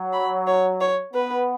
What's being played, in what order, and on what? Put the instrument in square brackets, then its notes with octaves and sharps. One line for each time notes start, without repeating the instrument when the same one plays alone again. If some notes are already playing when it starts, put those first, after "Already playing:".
Already playing: [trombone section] F#3
[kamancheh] B5
C#5
C#5
[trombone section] B3 [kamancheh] B4